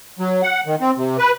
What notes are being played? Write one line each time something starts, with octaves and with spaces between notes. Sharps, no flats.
F#3
F#5
D#3
C4
C3
B4